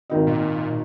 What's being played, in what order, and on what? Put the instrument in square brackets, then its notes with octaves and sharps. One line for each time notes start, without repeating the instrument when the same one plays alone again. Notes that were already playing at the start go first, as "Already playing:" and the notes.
[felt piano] G#1 D#3 D#5
[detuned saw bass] A#2